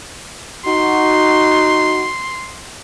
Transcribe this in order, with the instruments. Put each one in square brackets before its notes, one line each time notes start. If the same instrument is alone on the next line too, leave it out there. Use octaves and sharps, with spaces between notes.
[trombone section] D#4 F#4 [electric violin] C6